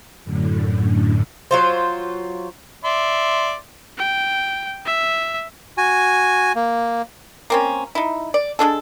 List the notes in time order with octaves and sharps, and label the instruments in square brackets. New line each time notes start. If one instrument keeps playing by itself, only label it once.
[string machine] F#2 A2 D3
[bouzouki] F#3 F4 C5
[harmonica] D5 E5 C6
[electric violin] G5
E5
[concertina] F#4 G#5
A#3
[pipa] A#3 C4 C#4
D#4 E4
D5
G#3 A#3 D4 A4